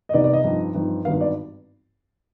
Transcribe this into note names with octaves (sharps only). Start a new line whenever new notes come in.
D#5
C2 C3 D#3 B3 D#4 D5
D5
D#5
G2 F3 C4 D#4
G2 F3 C4 D#4
G#1 G2 D#3 B3 D#4 F5
D5